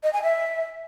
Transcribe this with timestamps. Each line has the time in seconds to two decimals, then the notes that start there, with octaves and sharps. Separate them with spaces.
0.03 D#5
0.13 G#5
0.23 E5